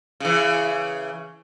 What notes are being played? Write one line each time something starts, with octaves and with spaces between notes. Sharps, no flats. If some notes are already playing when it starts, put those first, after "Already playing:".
C#3 E3